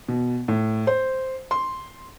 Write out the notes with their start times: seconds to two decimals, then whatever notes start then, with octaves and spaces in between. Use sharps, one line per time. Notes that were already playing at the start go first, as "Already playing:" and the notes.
0.08 B2
0.48 A2
0.87 C5
1.51 C6